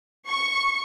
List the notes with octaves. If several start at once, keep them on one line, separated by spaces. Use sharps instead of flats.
C#6